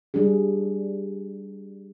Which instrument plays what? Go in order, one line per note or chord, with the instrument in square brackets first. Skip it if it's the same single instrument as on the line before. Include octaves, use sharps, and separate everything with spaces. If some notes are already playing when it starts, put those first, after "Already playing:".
[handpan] G3 D4 G#4